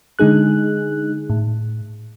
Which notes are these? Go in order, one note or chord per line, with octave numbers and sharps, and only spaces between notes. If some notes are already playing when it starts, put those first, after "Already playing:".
D3 G#3 D#4 G#4 F#6
A2